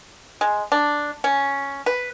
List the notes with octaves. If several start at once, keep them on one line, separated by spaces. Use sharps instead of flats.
G#3
D4
C#4
B4